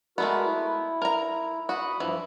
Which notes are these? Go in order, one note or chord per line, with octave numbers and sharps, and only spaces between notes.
G#3 A3 B3 F#4 A#4
E4
A#4 A#5
F#4 B5 D#6
G2 E3 F3